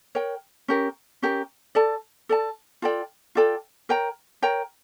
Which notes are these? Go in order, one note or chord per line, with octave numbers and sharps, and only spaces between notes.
A#4 C#5 G5
C#4 G4 A#4
C#4 G4 A#4
A4 D5 A5
A4 D5 A5
F4 A4 D5 G5
F4 A4 D5 G5
A#4 C#5 G5 A#5
A#4 C#5 G5 A#5